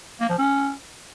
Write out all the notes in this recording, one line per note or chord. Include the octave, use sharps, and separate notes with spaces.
A#3
F3
C#4